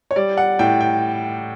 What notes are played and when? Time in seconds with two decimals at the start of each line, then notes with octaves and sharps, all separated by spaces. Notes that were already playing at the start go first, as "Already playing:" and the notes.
0.11 C#5
0.16 G3 D5
0.38 F#5
0.59 A2 G5
0.81 G5